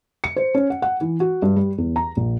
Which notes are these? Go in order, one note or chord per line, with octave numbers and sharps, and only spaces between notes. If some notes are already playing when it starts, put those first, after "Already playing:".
C#7
C5
C#4
F#5
F#5
E3
F#4
G2
G3
E2
A#5
A#1